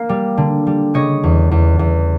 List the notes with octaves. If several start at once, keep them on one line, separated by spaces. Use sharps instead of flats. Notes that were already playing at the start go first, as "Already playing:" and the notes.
Already playing: A#3
G3
D3
G3
C#3 C#5 D#5
E2
E2
E2